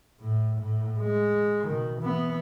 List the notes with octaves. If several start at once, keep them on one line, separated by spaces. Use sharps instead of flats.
A2
A2
G#3
B2 D#3
E3 B3